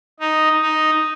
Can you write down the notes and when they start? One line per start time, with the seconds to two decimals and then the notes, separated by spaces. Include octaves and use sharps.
0.20 D#4
0.61 D#4